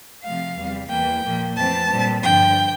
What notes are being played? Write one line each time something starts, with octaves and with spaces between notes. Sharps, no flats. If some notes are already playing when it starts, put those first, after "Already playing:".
C3 F3 A3 F5
E2 C3 G3
E2 E3 A#3 G5
A#2 F3 A#3
F2 E3 A3 C4 A5
A#2 G3 C4
G2 D3 F3 G5